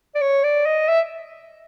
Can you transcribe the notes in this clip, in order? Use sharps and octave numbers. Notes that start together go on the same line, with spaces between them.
D5
C#5
D5
D#5
E5